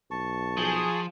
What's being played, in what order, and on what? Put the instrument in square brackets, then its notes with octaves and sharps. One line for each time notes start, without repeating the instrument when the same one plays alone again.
[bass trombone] B1 [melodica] A5 C#6
[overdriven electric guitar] F3 [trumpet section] G#4